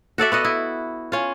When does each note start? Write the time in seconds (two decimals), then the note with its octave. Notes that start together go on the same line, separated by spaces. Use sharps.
0.18 F#4 A4 D5 E5
0.32 B3 F#4 D#5
0.45 E4
1.12 C#4 F4